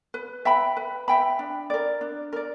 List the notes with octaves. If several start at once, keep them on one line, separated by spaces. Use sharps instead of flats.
B4
E5 G5 B5
B4
E5 G5 B5
D4
A#4 D5
D4
A#4 D5